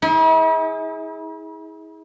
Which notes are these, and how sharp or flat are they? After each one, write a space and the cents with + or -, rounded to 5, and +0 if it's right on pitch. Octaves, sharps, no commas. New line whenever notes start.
E4 -45 G#4 +0